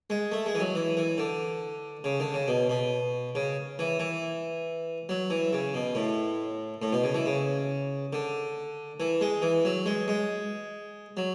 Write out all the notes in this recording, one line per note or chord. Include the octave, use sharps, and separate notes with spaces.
G#3
A3
G#3
E3
F#3
E3
E3
D3
C#3
D3
C#3
B2
B2
C#3
E3
E3
F#3
E3
C#3
B2
A2
A2
B2
C#3
E3
C#3
D3
E3
G#3
E3
F#3
G#3
G#3
F#3